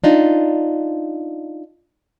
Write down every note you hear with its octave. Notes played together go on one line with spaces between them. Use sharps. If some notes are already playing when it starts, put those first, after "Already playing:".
D4 D#4 F4